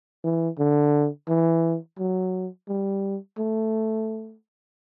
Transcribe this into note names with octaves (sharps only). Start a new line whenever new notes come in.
E3
D3
E3
F#3
G3
A3